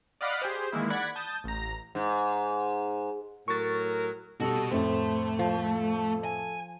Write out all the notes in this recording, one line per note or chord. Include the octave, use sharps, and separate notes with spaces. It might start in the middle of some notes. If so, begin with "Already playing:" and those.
D5 D#5 F5 F#5 B5 D6
G4 G#4 C5
D#3 E3 G#3 A#3 E4
D5 F#5 B5 G#6
A5 D#6 G6
A1 A#5
G#2
A2 F#3 A#4 C#6 A6
B2 G3 F#4 A4 D#5
F2 A2 A3 C5
F3 A4
G#5